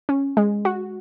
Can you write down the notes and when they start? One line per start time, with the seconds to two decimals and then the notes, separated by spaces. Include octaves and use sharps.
0.09 C#4
0.37 G#3
0.65 F#4